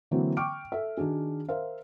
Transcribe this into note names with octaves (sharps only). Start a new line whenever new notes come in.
D3 E3 F#3 A#3 C4
G5 C#6 D6 F6 D7
A4 E5
D#3 D4 F#4 G#4
A#4 C5 E5 F5